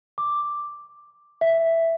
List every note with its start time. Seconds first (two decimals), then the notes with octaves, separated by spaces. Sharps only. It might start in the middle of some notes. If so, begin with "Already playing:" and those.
0.18 D6
1.41 E5